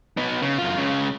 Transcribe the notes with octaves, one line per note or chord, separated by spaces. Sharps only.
B3 D#4
C#3
F#2 F4
C#2 C#3